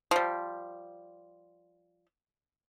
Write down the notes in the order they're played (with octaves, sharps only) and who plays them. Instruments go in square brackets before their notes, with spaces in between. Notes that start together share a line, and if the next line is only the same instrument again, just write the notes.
[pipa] F3 G3